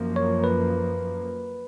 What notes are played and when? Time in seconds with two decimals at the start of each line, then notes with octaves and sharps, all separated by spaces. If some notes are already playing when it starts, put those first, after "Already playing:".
Already playing: F#2 F3 A#3
0.16 C#5
0.44 B4